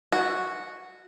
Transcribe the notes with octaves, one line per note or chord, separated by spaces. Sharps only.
F#4